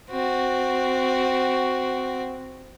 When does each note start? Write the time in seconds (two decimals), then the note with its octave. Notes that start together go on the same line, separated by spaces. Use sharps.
0.11 C4 F#4